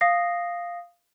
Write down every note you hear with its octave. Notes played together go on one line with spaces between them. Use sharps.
F5 D#6 A#6 C7